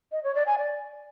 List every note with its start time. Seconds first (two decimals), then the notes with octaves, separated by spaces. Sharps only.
0.12 D#5
0.23 C#5
0.35 D5
0.47 G#5
0.58 D5